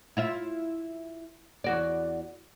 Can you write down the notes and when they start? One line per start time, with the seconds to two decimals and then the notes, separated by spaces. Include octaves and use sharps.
0.17 E4 F4 E5
1.64 E2 F#4 D5